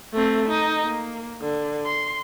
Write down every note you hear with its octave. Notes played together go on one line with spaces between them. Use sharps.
A3 C4
D#4
A#3
D3
C6